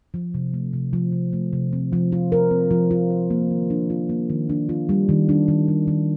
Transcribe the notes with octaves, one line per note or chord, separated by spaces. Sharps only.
F3
C3
A3
C3
F3
C3
A3
C3
C4
F3
F4
A#4
C4
F3
F4
A#4
A#3
D#3
D4
F4
A#3
D#3
D4
F4
G3
D#3
D4
D#3
G3
D#3